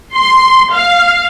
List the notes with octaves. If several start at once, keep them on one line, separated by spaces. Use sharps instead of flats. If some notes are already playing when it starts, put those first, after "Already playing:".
C6
F5